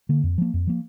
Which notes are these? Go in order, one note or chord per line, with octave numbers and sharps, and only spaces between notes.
D3 A#3
F2
F3 A#3
F2
F3 A#3